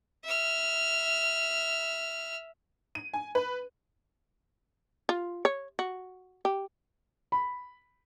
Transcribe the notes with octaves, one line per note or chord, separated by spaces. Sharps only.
E5 F6
D#7
G#5
B4
F4
C#5
F#4
G4
B5